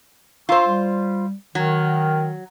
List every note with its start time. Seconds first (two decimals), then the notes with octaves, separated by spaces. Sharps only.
0.49 F4 C5 A#5 C#6 E6
0.66 G3
1.55 D#3 F#3